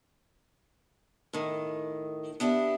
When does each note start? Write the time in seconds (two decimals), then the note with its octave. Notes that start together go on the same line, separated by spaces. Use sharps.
1.33 A2 D#3
2.40 B3 D4 E4 G4